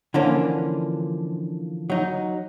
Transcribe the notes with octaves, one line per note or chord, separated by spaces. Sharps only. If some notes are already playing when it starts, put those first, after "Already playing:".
D3 E3 F3 A#3 C#4 D4
F#3 D#4